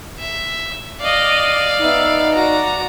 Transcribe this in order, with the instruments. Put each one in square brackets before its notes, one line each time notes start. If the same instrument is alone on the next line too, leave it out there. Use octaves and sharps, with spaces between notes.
[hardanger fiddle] E5
[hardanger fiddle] D5 F5 [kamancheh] D#5 D6
[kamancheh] B3 E5 [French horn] D#4
[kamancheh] F#4 D5 [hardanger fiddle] A#5